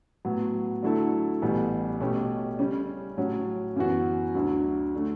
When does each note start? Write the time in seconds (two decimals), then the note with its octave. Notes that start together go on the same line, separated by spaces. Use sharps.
0.25 A2 F#3 B3
0.83 D3 F#3 A3 E4 A4
1.42 A1 A2 G3 B3
2.00 B2 A3 C#4 G4
2.59 C#3 G3 C#4
3.17 A2 F#3 C#4
3.76 F#2 E3 B3 F#4
4.34 D2 D3 F#3
4.95 D3 A3